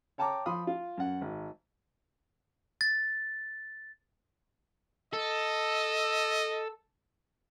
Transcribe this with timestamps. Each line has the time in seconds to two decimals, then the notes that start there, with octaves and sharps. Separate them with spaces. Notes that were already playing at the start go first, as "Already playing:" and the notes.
0.18 C#5 G5 A5 A#5 D6
0.46 F3 B5 C6 D#6
0.67 F4
0.98 F#2 F#5
1.21 G#1
2.81 A6
5.13 A4 D#5